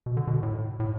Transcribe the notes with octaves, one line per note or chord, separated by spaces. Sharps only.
B2
D3
B2
A2
A2